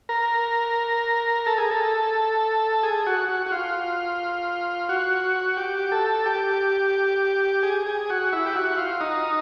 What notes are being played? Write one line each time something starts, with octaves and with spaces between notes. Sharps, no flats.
A#4
A4
G#4
A4
G#4
F#4
F#4
F#4
F4
F#4
G4
A4
G4
G#4
G#4
F#4
E4
G4
F#4
F4
D#4